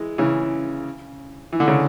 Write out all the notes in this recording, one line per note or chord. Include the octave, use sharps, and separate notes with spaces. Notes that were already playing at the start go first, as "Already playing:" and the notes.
Already playing: E3 G#3
C#3 E3
E3
D3
C#3